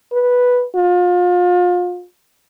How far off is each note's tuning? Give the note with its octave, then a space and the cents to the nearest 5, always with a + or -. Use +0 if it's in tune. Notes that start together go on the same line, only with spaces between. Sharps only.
B4 -5
F4 +30